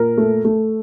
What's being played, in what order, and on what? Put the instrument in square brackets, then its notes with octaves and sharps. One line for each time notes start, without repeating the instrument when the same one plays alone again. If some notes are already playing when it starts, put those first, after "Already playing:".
Already playing: [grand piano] A#2 A#4
A3
A3